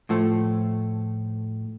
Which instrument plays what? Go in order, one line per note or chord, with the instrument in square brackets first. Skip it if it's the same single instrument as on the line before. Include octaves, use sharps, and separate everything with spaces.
[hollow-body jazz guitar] A2 F3 A3